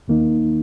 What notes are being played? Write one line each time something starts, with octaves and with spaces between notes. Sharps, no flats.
D#2 D#3 A#3 D#4